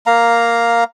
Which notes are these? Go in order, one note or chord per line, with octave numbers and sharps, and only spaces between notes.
A#3 F5 A#5